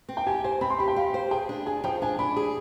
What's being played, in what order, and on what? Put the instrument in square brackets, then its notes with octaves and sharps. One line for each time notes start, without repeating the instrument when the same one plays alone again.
[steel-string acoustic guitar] C4
[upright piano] G5
[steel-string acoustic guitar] G4 [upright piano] G#5
[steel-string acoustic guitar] C5 [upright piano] G#5
[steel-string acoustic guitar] C4 [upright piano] B5
[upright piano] C6
[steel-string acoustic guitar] G4 [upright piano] B5
[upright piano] G5
[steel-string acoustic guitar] G4 [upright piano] F5
[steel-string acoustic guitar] C5
[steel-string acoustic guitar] G#4 [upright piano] G5
[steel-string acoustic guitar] D4
[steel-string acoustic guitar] G#4 [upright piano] G#5
[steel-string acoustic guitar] F3 [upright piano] G5
[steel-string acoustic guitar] D4 [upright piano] G#5
[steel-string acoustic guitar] D4 [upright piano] B5
[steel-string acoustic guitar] G#4